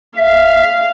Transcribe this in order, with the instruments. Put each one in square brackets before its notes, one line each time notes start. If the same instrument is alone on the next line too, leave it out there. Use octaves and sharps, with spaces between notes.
[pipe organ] E5 [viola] F5